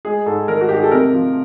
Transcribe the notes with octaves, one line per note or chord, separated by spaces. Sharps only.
G#3 G#4
G#2 A4
D#3 A#4
F#4
G#2 G4
G#4
A4
C3 A#4
F3